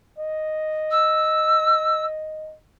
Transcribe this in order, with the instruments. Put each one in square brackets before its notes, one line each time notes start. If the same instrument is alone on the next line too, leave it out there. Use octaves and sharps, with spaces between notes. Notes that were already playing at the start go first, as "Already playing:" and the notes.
[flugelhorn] D#5
[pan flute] E6